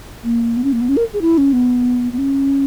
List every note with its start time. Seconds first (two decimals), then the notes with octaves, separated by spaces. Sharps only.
0.24 A#3
0.57 B3
0.64 C#4
0.73 A#3
0.81 B3
0.89 C#4
0.97 A#4
1.13 G#4
1.22 E4
1.38 C#4
1.53 B3
2.13 B3
2.18 C#4